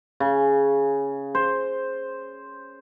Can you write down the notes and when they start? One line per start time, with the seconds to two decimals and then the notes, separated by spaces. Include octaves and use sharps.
0.20 C#3
1.35 C5